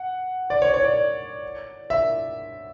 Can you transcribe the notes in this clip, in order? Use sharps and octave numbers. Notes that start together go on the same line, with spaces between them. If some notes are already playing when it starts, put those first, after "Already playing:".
Already playing: F#5
D5
C#5
C#5
D5
E5